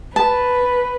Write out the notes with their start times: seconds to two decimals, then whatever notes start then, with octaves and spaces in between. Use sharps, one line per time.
0.16 B4 A5